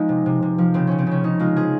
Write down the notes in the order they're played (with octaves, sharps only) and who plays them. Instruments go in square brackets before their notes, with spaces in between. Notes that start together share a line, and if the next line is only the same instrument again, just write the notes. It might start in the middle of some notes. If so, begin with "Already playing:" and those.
Already playing: [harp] F3 G#3 C4 D#4 G#4
C3
C3
C3
F3
C#3 C4
C#3 C#4
C4
C#3 C#4
C#3 D#4
G#3 F4
F3 G#4